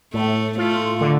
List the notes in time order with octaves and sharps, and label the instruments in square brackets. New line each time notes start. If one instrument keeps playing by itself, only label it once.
[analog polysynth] A2 [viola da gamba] A3
[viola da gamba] A3 [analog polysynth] F4
[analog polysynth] D3